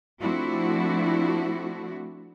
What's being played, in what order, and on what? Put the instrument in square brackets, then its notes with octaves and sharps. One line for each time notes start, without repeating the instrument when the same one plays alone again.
[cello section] F3 A3 C4 D4 E4 F#4